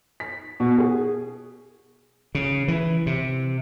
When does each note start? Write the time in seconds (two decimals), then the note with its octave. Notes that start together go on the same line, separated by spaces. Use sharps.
0.20 B6
0.60 B2
0.78 G#4
2.35 C#3
2.68 E3
3.07 C3